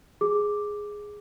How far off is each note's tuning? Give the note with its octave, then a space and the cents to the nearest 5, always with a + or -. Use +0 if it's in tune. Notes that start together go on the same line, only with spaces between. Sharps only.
G#4 +0 D6 +0